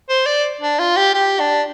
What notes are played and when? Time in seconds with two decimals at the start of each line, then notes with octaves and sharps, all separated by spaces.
0.09 C5
0.26 D5
0.61 D4
0.79 F4
0.97 G4
1.14 G4
1.40 D4